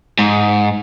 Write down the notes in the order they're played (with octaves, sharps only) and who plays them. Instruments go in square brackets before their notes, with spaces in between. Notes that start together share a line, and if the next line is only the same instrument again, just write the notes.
[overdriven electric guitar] G#2